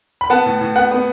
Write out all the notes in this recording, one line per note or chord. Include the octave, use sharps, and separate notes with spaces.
B5
B3 F#5 A5
A2
A2
B3 F#5
B3